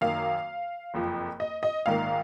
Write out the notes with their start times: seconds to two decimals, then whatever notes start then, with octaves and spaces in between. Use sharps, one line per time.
0.01 F#2 D#3 A#3 F5
0.94 F#1 F2 F3
1.40 D#5
1.63 D#5
1.86 A#1 G#2 D#3 A#3 F5